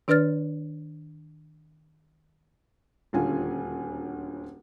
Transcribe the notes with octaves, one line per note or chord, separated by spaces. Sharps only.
D#3 D4 B4 D5 F6 A6
D#1 D2 C#4 F4 G#5